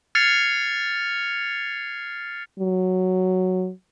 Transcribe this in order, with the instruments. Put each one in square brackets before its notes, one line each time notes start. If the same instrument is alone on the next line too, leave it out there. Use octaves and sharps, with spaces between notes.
[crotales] F6 G#6 A6 C7 C#7 F7
[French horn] F#3